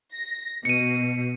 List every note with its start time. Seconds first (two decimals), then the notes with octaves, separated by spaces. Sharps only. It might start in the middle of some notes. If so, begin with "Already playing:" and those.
0.15 A#6
0.65 B2 C#7 D#7